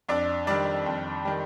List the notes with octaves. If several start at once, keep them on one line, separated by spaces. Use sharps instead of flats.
F2 D4 D5
D#3 G3 D4 D5
F2
D#3 G3